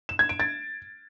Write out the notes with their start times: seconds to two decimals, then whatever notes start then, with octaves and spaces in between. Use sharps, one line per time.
0.09 E7
0.19 G#6
0.29 D7
0.40 A6